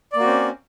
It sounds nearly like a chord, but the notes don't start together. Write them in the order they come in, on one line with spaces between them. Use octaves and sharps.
D5 A#3 F#4 C4 C#4